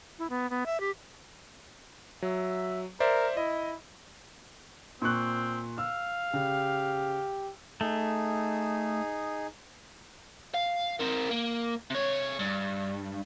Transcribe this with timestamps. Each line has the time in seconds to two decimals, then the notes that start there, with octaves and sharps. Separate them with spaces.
0.19 E4
0.30 B3
0.50 B3
0.66 E5
0.80 G4
2.22 F#3 E5
3.00 A#4 C5 D5 E5
3.37 E4 D#5
5.02 A#2 C4 C#6 F#6
5.78 F5 E6
6.33 C#3 G4
7.81 A3 D#4 G#4
10.54 F5
11.00 C4 A#4
11.31 A#3
11.91 C3 C#5
12.39 G2